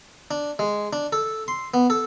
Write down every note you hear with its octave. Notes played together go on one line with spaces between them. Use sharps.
D4
G#3
D4
A4
C6
B3
A4